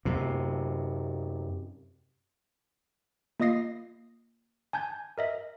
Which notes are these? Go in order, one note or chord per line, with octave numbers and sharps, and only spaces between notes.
F#2 C3
A#3 F4 D#5 D#6 A#6 C7
G#5 A5 G6 G#6
A#4 D#5 E5